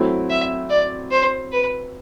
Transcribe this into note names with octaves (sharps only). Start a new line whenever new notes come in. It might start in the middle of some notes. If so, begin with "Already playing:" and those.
Already playing: F#3 A3 C4 E4
E5
D5
C5
B4